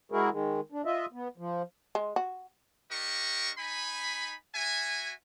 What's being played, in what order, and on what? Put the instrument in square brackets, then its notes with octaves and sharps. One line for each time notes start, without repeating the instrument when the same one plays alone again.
[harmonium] G#3 E4 F#4 G#4 A#4
D#3 G#3
D4
F4 D#5 E5
B3
F3
[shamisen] G#3
F#4
[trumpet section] D4 G4 A#4 D#5 C#6
D#4 G#5 B5
F#4 E5 G#5